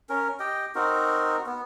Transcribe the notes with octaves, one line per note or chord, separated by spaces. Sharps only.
C#4 A#4
G4 D#5 G5
C4 D#4 F#4 A#4
B3